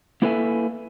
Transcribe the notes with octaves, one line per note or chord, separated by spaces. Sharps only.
A#3 E4 A4 B4 E5 G#5